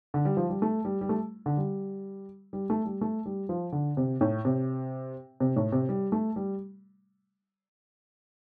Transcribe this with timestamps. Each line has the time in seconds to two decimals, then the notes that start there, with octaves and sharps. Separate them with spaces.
0.14 D3
0.25 G3
0.37 F3
0.50 G3
0.62 A3
0.85 G3
1.01 G3
1.09 A3
1.46 D3
1.57 G3
2.53 G3
2.70 A3
2.85 G3
3.01 A3
3.26 G3
3.49 F3
3.72 D3
3.97 C3
4.21 A2
4.45 C3
5.40 C3
5.56 A2
5.72 C3
5.89 G3
6.12 A3
6.36 G3